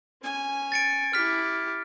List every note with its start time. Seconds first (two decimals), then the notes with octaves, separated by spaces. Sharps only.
0.22 C#4 G#5
0.72 A6 C#7 D7
1.13 E4 G4 F6 B6